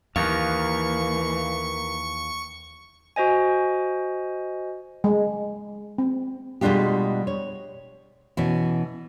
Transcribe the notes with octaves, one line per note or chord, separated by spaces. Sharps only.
D#2 E3 A#3 A#4 F5 C#6
F#4 C5 D#5 G#5
G#3
C4
B2 G3 G#3 D4 F4 G4
C#5
B2 E3 C#4 E4